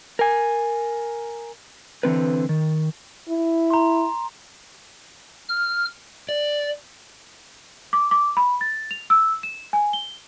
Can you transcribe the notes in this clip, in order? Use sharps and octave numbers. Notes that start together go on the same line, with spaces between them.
A#4 G#5
D3 E3 C4 B4
D#3
E4
A#5 C6
F6
D5
D6
D6
B5
A6
F7
E6
E7
G#5
G7